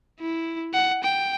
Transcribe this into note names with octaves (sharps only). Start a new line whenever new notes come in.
E4
F#5
G5